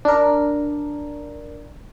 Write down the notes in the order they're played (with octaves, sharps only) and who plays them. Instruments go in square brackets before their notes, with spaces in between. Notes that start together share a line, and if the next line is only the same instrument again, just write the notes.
[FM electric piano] D4 A#4